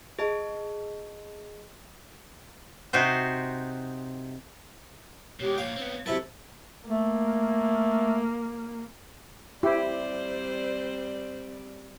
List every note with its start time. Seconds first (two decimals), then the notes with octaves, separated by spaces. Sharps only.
0.19 G#4 D#5 A5
2.93 C3 D#4 F#4 C5
5.40 B2 G#3 G4 C#5
5.58 A#2 F3 C#5 F5
5.76 B3 C4
6.06 C3 F#3 E4 A4
6.88 A3 A#3
9.63 G3 C4 E4 G4 C5 D5